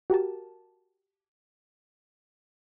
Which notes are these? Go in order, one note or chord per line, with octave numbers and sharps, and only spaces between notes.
F#4 G4 A#4 A5